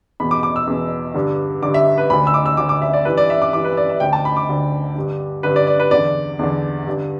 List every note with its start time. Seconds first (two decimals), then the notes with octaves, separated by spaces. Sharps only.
0.20 E2 B2 B5
0.31 D6
0.43 D6
0.56 E6
0.67 E2 B2
1.14 G2 D3
1.62 G2 D3 D6
1.74 E5
1.98 B4
2.10 D2 D3 B5
2.27 E6
2.34 D6
2.46 E6
2.57 D2 D3 D6
2.69 D6
2.82 E5
2.93 D5
3.05 G2 E3 B4
3.17 D5
3.30 E5
3.42 D6
3.53 G2 E3 D6
3.64 B4
3.77 D5
3.89 E5
4.00 D2 D3 G5
4.13 A5
4.25 B5
4.37 D6
4.49 D2 D3
4.95 G2 D3
5.43 G2 D3 B4
5.56 D5
5.67 D5
5.80 B4
5.91 E2 D3 D5
6.39 E2 D3
6.87 G2 D3